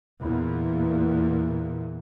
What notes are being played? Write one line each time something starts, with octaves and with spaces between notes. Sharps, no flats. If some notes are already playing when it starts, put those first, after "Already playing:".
E2 A#2